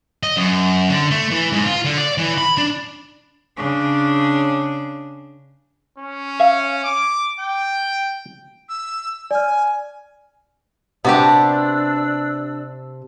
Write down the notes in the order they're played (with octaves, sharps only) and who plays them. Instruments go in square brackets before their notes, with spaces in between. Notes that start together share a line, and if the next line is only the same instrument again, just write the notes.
[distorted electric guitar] D#5
F#2
D3
A3
E3
G#2
F4
D3
D5
E3
B5
D4
[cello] C#3 D4
[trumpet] C#4
[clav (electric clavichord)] E5 F5
[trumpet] D6
G5
[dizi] E6
[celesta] D5 F6 [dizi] G#5
[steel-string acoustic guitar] C3 A5 [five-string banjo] B3 F#4 G4 [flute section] D4 D5 E6